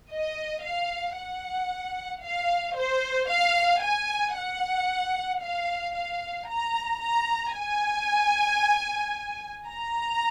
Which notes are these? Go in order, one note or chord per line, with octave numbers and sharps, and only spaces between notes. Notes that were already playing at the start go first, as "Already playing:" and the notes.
D#5
F5
F#5
F5
C5
F5
G#5
F#5
F5
F5
A#5
A#5
G#5
A#5